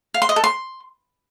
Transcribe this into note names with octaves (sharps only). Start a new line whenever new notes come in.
F5
C6
D#5
A4
C6